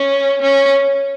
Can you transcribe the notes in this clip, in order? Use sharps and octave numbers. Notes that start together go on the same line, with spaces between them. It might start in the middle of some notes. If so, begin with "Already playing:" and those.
Already playing: C#4
C#4